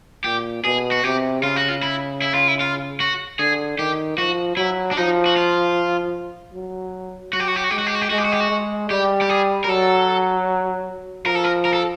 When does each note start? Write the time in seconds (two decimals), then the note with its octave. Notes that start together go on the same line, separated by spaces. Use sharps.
0.24 A#2 G4
0.64 B2 G#4
0.92 F#4
1.04 C3 G4
1.42 C#3 F4
1.56 F#4
1.69 F4
1.83 E4
2.22 E4
2.34 F4
2.48 E4
2.60 F4
3.00 F#4
3.39 D3 G#4
3.78 D#3 G4
4.18 F3 F#4
4.57 F#3 E4
4.91 D4
4.96 F3 D#4
5.26 F#4
5.36 F4
6.53 F#3
7.33 F#3 F#4
7.40 G4
7.48 F#4
7.56 G4
7.64 F#4
7.71 G#3 G4
7.79 F#4
7.87 G4
7.95 F#4
8.01 G4
8.10 G#3 F#4
8.18 G4
8.25 F#4
8.32 G4
8.40 F#4
8.50 G#3
8.91 G3 G4
9.22 G4
9.29 G#4
9.64 A#4
9.68 F#3 A4
11.26 F3 A#4
11.35 A4
11.44 A#4
11.65 A#4
11.73 A4